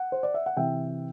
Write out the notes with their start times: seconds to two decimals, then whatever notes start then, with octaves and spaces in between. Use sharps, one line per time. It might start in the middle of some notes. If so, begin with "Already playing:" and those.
Already playing: F#5
0.12 C5
0.23 D5
0.34 E5
0.46 F#5
0.57 C3 E3 E5 G5